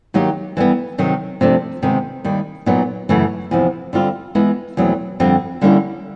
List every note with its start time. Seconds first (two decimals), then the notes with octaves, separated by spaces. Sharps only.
0.14 D#3 F#3 A#3 D#4 G4
0.57 E3 G3 B3
0.98 C3 D#3 F#3
1.41 F2 C3 F3 A3 D4
1.83 C3 D#3 G#3 B3
2.24 D#2 D#3 G3
2.66 A#2 F#3 B3 D#4
3.09 F#2 C#3 E3 A3
3.51 E2 C3 F3
3.93 D3 G3 C4 F4
4.35 E3 G#3 B3 E4
4.77 E2 B2 F#3 A3 C4
5.20 F2 D3 G3 C4
5.62 D3 G3 A#3 C#4 E4